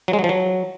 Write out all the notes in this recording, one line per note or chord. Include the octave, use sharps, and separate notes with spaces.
F#3
G#3
F#3
F3
F#3